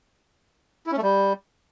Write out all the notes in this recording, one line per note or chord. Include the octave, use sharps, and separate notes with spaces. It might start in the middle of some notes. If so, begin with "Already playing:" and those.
E4
C#4
A3
G3